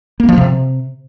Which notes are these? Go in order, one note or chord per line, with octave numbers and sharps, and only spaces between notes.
A#3
F3
C3